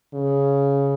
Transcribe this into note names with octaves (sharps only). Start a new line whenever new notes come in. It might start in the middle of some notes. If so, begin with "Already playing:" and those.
C#3